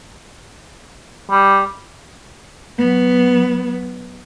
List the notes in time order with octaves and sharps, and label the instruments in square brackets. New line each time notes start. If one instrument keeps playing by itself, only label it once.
[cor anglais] G3
[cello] F#3 B3